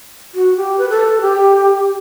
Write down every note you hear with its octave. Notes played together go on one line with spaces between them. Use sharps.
F#4
G4
B4
A4
G4